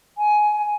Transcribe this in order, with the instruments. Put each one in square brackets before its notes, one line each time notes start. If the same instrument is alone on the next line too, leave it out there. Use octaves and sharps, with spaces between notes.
[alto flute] G#5